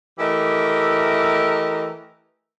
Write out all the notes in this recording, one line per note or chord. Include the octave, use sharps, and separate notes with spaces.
E3 A3 G4 A#4 D#5